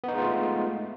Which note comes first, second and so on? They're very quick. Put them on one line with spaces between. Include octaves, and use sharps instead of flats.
B3 D#4 G#3 F4 A3